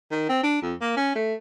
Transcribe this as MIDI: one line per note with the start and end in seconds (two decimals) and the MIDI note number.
0.11 0.28 51
0.29 0.42 60
0.43 0.61 62
0.62 0.75 41
0.81 0.96 58
0.97 1.12 61
1.16 1.34 57